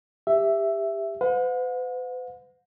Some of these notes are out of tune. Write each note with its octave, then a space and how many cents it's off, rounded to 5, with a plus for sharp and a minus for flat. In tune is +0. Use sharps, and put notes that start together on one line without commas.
G4 +20 E5 +5
B4 +45 F#5 -45